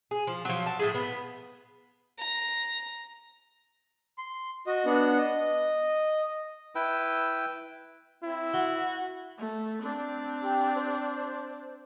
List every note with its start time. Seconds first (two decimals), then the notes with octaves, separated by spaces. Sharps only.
0.11 G#4
0.27 F3
0.45 F3 F#3
0.66 A5
0.79 A2 A3 G#4
0.95 B3
2.18 A#5
4.18 C6
4.67 F#4 D#5
4.86 B3 D4 F#5
5.18 D#5
6.75 E4 B4 G5 E6
8.24 C4 E4
8.53 F#4 F#5 G7
9.38 A3
9.82 C4 D4
10.42 G4
10.75 C5